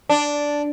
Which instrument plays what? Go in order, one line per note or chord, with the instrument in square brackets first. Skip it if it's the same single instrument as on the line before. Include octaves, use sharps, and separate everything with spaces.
[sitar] D4